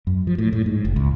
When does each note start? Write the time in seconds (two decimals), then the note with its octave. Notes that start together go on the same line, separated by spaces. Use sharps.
0.07 F#2
0.27 F3
0.38 A2
0.53 A2
0.66 G#2
0.85 F#1
0.96 C#2